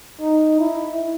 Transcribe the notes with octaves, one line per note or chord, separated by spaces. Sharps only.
D#4
E4